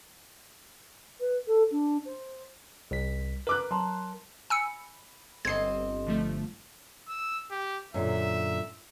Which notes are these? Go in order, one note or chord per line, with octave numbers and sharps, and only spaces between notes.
B4
A4
D4
C5
C2 B6
A#4 B4 D6 F#6
F#3 A5 A#5 C6
G#5 B5 E6 C#7
G1 C4 D#5 G#6 C7
D3 F3 A3
E6
G4
F#2 A#2 D3 E5